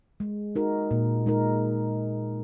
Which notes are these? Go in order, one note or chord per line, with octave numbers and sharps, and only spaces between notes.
G#3
D#4 F#4 A#4
A#2
G#3 D#4 A#4